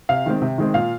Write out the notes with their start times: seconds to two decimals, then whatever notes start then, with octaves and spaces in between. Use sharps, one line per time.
0.09 C3 F5
0.26 D#3 G#3 C4
0.42 C3
0.58 D#3 G#3 C4
0.74 A#2 F5